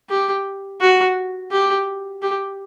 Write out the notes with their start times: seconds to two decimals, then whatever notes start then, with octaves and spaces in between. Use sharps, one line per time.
0.09 G4
0.81 F#4
1.51 G4
2.22 G4